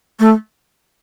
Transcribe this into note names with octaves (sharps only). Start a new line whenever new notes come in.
A3